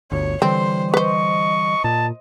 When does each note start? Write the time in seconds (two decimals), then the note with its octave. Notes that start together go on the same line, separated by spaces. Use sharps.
0.12 G1 D2 C#5
0.42 D3 E3 G3 C4 C5
0.94 B4 C5 D#5 C#6
1.84 A#2 A5